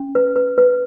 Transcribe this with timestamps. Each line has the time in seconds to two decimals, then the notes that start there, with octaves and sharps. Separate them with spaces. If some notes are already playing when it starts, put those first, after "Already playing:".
Already playing: C#4
0.15 B4
0.36 B4
0.58 B4